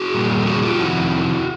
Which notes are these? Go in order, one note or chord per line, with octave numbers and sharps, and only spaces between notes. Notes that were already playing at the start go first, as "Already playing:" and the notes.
Already playing: F#4 G#4
A#2 G3 A#3
A4
F#4 G#4
F4 G4
F2 C3 D#3 E4 F#4